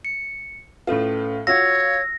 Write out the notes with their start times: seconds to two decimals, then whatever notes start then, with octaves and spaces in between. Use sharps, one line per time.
0.05 C#7
0.87 A2 C#4 F4 A4 B4
1.47 F4 F#4 C#5 F5 E6 A#6